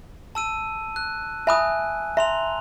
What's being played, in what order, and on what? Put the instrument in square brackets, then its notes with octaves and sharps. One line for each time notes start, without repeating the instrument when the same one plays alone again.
[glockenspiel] A5 E6 D#7
F#6
[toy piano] E5 B5 D#6 [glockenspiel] G#5 F#6
[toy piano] E5 [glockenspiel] A#5 C6 F7